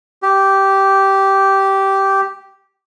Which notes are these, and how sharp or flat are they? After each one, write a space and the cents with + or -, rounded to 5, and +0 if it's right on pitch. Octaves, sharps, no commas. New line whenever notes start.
G4 -10